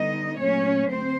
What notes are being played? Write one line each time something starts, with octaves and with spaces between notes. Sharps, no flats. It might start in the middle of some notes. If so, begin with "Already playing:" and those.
Already playing: D3 G3 B3 D#4 D#5
A#2 F#3 A3 C#4 C#5
D2 C4 C5